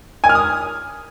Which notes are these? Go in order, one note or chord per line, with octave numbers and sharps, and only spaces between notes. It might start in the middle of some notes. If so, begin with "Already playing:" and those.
G#5
F6
D#6